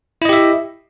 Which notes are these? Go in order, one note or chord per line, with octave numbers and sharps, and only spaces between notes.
E4 G4 D#5 E5